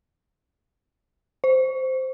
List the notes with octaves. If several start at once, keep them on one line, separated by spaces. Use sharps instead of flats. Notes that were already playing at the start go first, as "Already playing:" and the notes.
C5